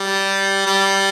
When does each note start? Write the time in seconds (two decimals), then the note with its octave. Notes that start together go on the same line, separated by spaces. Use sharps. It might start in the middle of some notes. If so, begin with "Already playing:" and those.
Already playing: G3
0.67 G3